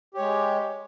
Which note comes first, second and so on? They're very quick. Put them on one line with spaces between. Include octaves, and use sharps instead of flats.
G4 C#5 G#3